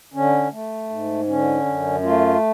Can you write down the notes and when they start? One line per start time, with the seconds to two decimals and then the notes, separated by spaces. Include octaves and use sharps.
0.14 D3 C#4
0.51 A3
0.90 G#2
1.28 D3 C#4
1.65 F#2
2.03 A3 F4